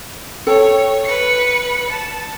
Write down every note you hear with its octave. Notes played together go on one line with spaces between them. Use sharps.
A4 C#5 G5
B4 C#7
A5